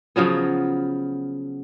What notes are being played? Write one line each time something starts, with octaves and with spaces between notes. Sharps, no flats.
C#3 F3 F#3 B3